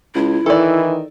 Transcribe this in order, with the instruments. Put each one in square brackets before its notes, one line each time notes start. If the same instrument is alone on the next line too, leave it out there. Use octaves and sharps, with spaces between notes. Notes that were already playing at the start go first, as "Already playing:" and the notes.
[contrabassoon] C#2 [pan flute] E4
[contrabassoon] D#3 [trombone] E3 [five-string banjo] A4 D5